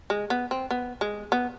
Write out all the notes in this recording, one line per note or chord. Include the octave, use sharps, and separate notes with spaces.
G#3
B3
C4
B3
G#3
B3